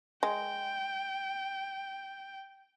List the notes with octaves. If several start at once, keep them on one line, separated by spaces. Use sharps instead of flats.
G#3 G5